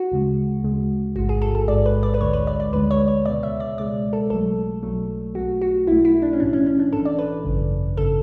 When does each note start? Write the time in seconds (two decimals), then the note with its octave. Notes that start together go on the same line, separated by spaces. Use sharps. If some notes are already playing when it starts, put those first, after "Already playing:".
Already playing: F#4
0.11 D2 C#3 G#3
0.63 D2 C#3 G#3
1.16 A1 G#2 G#3 F#4
1.29 G#4
1.42 A4
1.55 A4
1.68 A1 G#2 G#3 D5
1.86 B4
2.03 D5
2.14 B4
2.21 D2 D3 G#3 C#5
2.33 B4
2.47 D5
2.60 D5
2.73 D2 D3 G#3 B4
2.91 C#5
3.08 C#5
3.26 C#2 B2 G#3 D5
3.43 E5
3.60 D5
3.78 C#2 B2 G#3 D5
4.13 A4
4.30 B1 B2 F#3 A3 A4
4.83 B1 B2 F#3 A3
5.35 B1 B2 A3 F#4
5.62 F#4
5.87 B1 B2 A3 E4
6.05 E4
6.22 D4
6.33 C#4
6.40 B1 A2 E3 D4
6.53 C#4
6.66 C#4
6.79 D4
6.92 B1 A2 E3 A4
7.05 D5
7.19 B4
7.44 G#1 F#2 C#3
7.97 G#1 C#3 A4